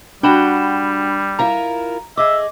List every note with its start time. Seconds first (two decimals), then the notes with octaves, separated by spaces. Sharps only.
0.23 G3 D4 F#4 F#5 G5 B5 E7
1.39 E4 F4 A#4 A#5
2.17 G#4 D#5 E5 D6